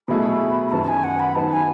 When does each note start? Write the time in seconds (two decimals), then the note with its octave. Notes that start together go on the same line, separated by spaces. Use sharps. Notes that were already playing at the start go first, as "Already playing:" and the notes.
0.08 B2 F#3 A3 E4 G#4 B5
0.67 B5
0.72 F#2 D#3 F#3 B3 F#4 A5
0.83 A5
0.88 G#5
1.04 F#5
1.19 B5
1.35 D#3 F#3 B3 D#4 A5
1.52 G#5